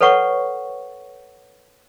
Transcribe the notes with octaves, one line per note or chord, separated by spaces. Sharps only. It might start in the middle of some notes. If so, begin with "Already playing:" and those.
A4 B4 C#5 F#5 C#6